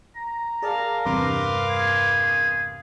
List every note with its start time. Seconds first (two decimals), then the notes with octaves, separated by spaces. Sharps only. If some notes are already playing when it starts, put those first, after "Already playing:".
0.16 A#5
0.62 G#4 A#4 D5 F5 A5
1.06 E2 G2 C3 B4 C6 D6
1.69 G#4